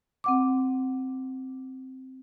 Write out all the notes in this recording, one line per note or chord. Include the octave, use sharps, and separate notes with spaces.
C4 F#5 D6